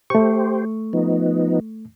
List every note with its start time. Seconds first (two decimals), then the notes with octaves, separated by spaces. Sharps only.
0.10 A3 G4 C5 C#6
0.93 F3 B3 D#4